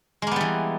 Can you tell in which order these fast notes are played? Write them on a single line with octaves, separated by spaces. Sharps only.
G#3 A#3 B3 G3 E3